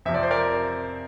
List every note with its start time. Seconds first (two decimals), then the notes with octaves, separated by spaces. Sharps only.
0.05 F2 C3 F3 E5
0.14 D5
0.23 C5
0.31 A#4 D5